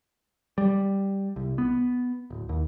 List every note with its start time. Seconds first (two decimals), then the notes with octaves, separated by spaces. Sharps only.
0.58 G3
1.36 C2
1.58 B3
2.30 D1
2.49 D#2